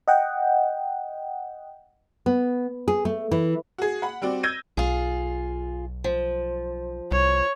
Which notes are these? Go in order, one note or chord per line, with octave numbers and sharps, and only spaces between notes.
D#5 F#5 G5
B3
G#4
A3
E3
F#4 G#4
F#5 B5
G3 C4 F#4 D5
E6 G6 G#6 A#6 D#7
B1 F4 G#4
F3
C2 C#5